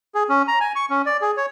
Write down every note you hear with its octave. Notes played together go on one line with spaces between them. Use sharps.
G#4
C#4
A#5
G#5
C#6
C#4
D5
G#4
C#5